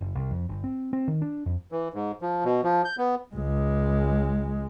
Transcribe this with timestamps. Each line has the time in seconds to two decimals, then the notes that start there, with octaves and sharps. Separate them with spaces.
0.01 F#1
0.15 C2
0.31 F2
0.49 G1
0.64 C4
0.93 C4
1.08 D#3
1.22 D4
1.46 F2
1.72 E3
1.94 G#2
2.22 F3
2.44 B2
2.63 F3
2.85 G6
2.98 B3
3.35 C#2 G#3